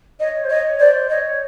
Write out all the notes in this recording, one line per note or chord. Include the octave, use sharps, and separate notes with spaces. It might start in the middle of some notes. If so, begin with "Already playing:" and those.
C#5 D#5
C5
C#5 D#5
C5 D5
C#5 D#5